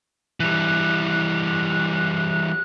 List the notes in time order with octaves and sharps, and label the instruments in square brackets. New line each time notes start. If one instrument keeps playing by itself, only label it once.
[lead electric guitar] E3 G3 [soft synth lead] F#6